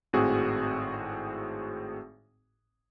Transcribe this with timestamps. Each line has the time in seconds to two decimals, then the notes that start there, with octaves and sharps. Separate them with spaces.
0.13 G#1 A2 C4 F#4 G#4